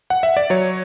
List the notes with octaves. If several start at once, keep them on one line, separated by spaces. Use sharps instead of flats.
F#5
E5
D5
F#3 C#5